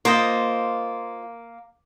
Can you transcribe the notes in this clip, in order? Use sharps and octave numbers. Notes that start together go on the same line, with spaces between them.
A#3 F4 C5 D#5